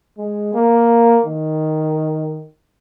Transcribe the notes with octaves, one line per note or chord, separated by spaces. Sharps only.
G#3
A#3
D#3